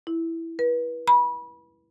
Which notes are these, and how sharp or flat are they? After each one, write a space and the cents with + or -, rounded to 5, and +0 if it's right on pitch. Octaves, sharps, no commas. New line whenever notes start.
E4 +0
B4 -30
B5 -25